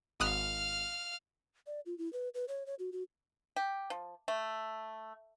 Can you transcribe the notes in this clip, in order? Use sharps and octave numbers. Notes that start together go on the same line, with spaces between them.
G#1 F5 D#6 F6 F#6
D5
F4
E4
B4
B4
C#5
C#5
F#4
F#4
G4
F3
A3